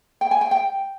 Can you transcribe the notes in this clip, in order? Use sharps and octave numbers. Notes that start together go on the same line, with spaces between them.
G5
G#5
G5
G5